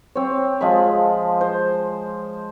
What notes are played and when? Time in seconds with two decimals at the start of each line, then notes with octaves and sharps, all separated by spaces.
0.15 C4 C#5
0.61 F3 G#3 G#4 B5
1.41 C5